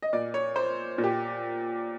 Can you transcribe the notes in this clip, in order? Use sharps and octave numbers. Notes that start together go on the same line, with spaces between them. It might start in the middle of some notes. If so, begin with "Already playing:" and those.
D#5
A#2 D5
C#5
C5
A#2
G4